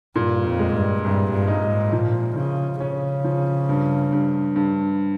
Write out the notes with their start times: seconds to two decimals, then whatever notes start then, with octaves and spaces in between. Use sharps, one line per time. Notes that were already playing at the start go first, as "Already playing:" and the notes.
0.16 G2 A#2
0.45 F2
0.59 G#3
0.74 G2
1.04 C2 G2
1.33 G2
1.48 D#4
1.62 G#2
1.92 A#2 F3
2.36 C#3 F3
2.80 C#3 C#4
3.24 F3
3.69 G2
4.12 G2
4.56 G2